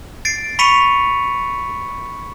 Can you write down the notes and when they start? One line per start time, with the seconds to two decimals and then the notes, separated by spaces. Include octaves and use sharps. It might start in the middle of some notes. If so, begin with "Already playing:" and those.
0.25 A6 C7 D7
0.59 B5 C#6 B6 C#7 D#7 F7